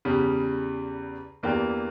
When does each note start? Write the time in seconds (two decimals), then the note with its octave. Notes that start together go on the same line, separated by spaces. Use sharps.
0.05 E2 C#3 G3
1.43 E2 E3 A#3 D4 G4